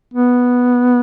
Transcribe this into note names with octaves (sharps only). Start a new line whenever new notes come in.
B3